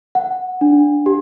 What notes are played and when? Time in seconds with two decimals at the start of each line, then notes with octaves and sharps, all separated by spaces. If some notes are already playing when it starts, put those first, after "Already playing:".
0.15 F#5
0.61 D4
1.06 G4